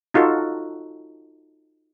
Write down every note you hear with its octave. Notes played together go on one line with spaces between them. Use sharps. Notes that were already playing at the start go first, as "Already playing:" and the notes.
D#4 F4 F#4 A4